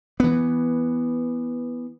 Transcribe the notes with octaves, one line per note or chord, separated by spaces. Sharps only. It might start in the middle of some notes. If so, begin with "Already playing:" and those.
E3 B3